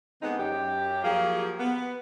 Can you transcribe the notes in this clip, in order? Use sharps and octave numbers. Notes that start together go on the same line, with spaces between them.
D3 G#3 B3 C4 D#4
F#2 G4
F3 F#3 A#3 F4 G4 G#4
B3